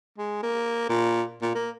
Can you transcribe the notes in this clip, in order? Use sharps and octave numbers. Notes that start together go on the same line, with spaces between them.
G#3
A#3
A#2
A#2
A#3